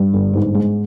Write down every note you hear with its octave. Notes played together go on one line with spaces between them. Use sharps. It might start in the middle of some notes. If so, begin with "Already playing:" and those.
Already playing: G2
G1
G#2
G#3